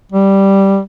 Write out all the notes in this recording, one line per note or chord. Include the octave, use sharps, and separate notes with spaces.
G3